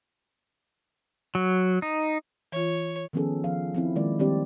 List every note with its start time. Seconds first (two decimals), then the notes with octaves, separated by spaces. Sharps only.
1.35 F#3
1.82 D#4
2.52 E3 F4 C#5
3.13 D#3 F3 B3 C#4 G#4 A4
3.44 F3 F5
3.74 F3 C4 E4
3.96 D#3 G#3 A#3 E4 D5
4.19 D#3 G3 C4 D4 G4 D5